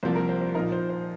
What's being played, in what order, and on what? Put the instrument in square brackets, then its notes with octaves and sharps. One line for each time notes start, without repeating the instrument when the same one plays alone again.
[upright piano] C2 C3 F3 A#3 C5
A#4
C5
C5
A#2 F3 D#4 A#4
C5
C5